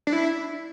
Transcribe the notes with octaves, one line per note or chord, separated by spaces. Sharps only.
D4
E4